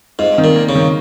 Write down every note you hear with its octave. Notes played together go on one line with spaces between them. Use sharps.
G#2 F4
D#3
A#2
A#3
C#3
D#3